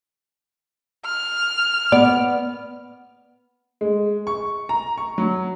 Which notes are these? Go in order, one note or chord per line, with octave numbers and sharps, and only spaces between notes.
F6
B3 D5
G#3
C#6
A#5
C#6
F#3